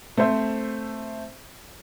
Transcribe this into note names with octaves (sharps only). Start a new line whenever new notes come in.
A3 C4 C5 E5